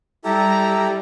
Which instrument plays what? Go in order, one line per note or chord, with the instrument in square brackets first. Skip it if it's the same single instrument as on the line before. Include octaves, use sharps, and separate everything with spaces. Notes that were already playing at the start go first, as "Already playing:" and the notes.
[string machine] G3 [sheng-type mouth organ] E4 G4 A4 [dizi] A#5